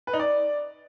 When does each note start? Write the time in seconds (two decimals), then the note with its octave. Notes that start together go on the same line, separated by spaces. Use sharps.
0.07 B4
0.13 D#4
0.20 D5